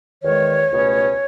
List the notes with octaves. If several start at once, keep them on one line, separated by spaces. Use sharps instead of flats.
E2 D#3 G#3 C#5
C#2 B2 A3 C#4